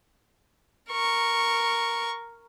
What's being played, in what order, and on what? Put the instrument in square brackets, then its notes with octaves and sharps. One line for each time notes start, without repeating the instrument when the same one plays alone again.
[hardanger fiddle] A#4 C#6